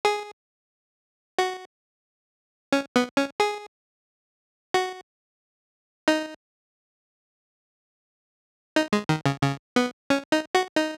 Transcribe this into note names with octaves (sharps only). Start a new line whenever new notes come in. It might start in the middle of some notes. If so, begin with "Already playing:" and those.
G#4
F#4
C#4
B3
C#4
G#4
F#4
D#4
D#4
G#3
D#3
C#3
C#3
B3
C#4
D#4
F#4
D#4